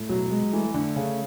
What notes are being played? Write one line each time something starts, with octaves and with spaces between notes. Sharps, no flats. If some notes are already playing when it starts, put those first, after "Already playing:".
Already playing: A2
B2 F#3
G#3
E3 A3
D3 A3
C#3 C#4